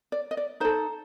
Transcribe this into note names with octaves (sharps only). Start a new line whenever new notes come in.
D5
D#5
D5
D#4 A4 C5